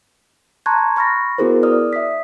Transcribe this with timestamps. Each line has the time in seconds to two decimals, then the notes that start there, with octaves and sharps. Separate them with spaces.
0.66 A5 A#5 C6 C#6 F#6 G#6
0.96 B5 C#6 F6 A6 A#6
1.38 B3 E4 F#4 G#4 A#4 C5
1.63 D5 D#6 F6
1.93 E5 D#6 B6